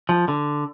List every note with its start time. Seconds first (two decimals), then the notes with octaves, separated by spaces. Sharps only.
0.09 F3
0.28 D3